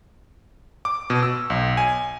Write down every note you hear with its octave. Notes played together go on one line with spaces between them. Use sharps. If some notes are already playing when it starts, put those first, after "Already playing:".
D6
B2
E6
B1
G#5